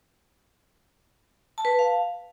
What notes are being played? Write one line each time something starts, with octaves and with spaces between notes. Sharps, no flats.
A5
B4
A5
F5